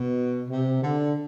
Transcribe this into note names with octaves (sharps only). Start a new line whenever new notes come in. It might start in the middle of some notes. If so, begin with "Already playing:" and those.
Already playing: B2
C3
D3